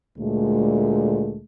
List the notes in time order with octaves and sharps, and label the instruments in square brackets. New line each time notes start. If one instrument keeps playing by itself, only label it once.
[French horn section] D2 A#2 G#3 A3